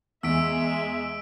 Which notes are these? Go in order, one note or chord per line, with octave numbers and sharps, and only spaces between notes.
E2 G#3 E5 E6 B6 D7